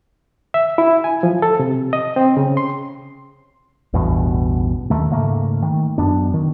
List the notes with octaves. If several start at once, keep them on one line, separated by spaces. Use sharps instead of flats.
E5
E4
G#5
F3
A4
C3
D#5
C4
C#3
C6
A1 E2 G2 B2
D#2 D#3 A3
G#2 C#3 A3 A#3
D#3
F#2 B3 D4
D#3